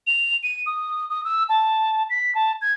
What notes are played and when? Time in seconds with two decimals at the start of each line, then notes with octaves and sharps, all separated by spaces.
0.07 F7
0.43 D#7
0.66 D#6
1.09 D#6
1.25 E6
1.49 A5
2.10 B6
2.35 A5
2.61 G#6